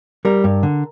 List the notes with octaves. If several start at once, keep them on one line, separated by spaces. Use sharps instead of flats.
G3 A#4
G2
D3